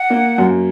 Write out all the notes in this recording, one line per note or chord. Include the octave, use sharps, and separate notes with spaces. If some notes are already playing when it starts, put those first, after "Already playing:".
Already playing: F#5
A#3
F#2